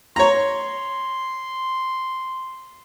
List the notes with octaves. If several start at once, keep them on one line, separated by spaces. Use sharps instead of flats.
C#5 A#5 C6